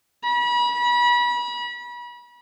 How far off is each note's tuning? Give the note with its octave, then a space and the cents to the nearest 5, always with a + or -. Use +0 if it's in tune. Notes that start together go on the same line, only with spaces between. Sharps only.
B5 -35